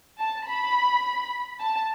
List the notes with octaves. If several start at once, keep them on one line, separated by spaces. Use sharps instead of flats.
A5
B5
A5